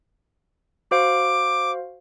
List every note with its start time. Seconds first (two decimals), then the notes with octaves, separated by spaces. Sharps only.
0.91 F#4 C5 F5 D6